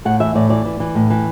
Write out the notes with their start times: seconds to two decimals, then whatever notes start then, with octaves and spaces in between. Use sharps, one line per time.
0.05 A2 F#5
0.20 E3 E5
0.35 A2 D5
0.50 E3 D5
0.65 E3
0.80 E3
0.95 A2
1.10 E3